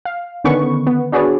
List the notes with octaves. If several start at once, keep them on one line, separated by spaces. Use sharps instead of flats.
F5
D3 D#3 B3 C#4 B4 C#6
B3
D4 F#4 G#4 B4 C#5 D5